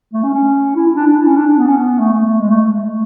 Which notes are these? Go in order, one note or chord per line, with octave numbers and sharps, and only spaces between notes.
A3
C#4
C#4
E4
E4
D4
D4
E4
C#4
D4
D4
B3
C#4
B3
A3
A3
A3
G#3
A3
A3
G#3
A3